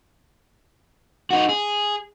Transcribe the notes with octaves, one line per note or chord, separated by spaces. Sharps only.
D#4 F#4
G#4